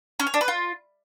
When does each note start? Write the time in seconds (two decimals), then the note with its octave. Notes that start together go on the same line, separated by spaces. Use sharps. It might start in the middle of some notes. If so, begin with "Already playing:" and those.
0.20 C#4
0.27 C#5
0.34 D4
0.41 B4
0.48 F4